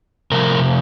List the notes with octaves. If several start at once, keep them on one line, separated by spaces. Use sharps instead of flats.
C3 F3 A3 A#4